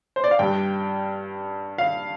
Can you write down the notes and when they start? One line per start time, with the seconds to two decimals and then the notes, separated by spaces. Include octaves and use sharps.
0.16 C5
0.24 D5
0.31 F5
0.39 G2 G3 G5
1.78 F5